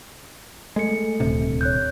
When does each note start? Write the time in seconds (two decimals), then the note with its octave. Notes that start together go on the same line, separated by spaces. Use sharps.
0.76 G#3 A3 A4 C#7
1.20 D#1 D2 C3
1.61 C#5 F#6 G6